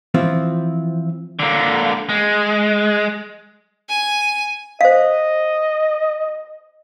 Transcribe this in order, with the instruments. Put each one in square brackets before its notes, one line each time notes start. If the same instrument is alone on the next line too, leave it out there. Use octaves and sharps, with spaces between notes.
[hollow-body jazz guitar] E3 F3 C4 F4
[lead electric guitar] D3 A#3
G#3
[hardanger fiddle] G#5
[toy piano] C5 F5 [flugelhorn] D#5